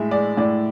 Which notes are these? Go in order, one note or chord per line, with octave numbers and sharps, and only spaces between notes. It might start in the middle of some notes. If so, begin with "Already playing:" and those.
Already playing: A2 G#3 E5
G#3 D5
A2 D5